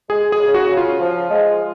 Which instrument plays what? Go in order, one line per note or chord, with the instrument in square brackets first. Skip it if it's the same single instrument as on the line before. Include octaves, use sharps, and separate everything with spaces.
[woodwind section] G#3 [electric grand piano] G#4
[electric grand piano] G#4
[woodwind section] C#3
[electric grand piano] F#4
[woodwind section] C#3
[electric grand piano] F4
[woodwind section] F3
G#3